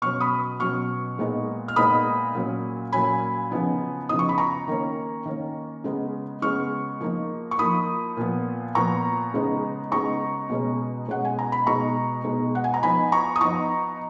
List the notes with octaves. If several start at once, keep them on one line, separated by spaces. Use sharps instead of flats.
B2 F#3 C#4 C#6 F6
B5 D#6
B2 F#3 C#4 C#6 F6
A#2 G#3 B3 D#4
F6
A#2 G#3 B3 D#4 B5 D#6
A#2 F#3 C#4
A#2 F#3 C#4 G#5 B5
C#3 F3 B3 D#4
C#3 F3 B3 D#4 D#6
C#6
B5
A#5 C#6
D#3 A#3 C#4
D#3 A#3 C#4
C#3 G#3 B3
C#3 G#3 B3 C#6 F6
F3 A#3 D#4
C#6
F3 A#3 D#4 B5 D#6
A#2 F3 B3
A#2 F3 B3 A#5 C#6
C#3 G#3 B3 D#4
C#3 G#3 B3 D#4 A#5 C#6
B2 G#3 C#4
B2 G#3 C#4 F#5
G#5
A#5
B5
B2 G#3 D#4 A#5 C#6
B2 G#3 D#4
F#5
G#5
A#5
F3 B3 D#4 G#5 B5
A#5 C#6
D#6
F3 B3 D#4 A#5 C#6